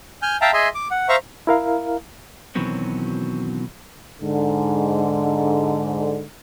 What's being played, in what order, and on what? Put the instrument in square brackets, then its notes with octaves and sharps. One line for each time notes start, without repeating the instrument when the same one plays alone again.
[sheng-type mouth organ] G#5 F6 G6
E5 F5 G5 A5 A#5
G#4 D#5 E5 C6
D6
F#5
C5 E5 F5 A#5 C#6
[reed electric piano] E4 A#4 F5
[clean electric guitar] B2 D#3 E3 F#3 C4 C#4
[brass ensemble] G#2 D3